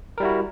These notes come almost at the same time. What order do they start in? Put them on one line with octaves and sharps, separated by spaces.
A#4 G3 E4 F#4